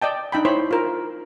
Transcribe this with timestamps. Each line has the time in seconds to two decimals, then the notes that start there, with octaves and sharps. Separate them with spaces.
0.02 D5 D#5 G5 A5
0.32 D4 D#4 G5 B5
0.45 E4 C5 C#5 B5 C6
0.71 F4 A#4